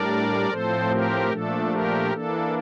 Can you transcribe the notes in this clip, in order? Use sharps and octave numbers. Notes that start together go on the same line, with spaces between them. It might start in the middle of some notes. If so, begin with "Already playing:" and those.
Already playing: A2 G3 D4 A#4 D5
A2 F3 C4 A4 C5
G4 A#4
A#2 F3 A3 D4 A4
G4 A#4
E3 A#3 D4 A4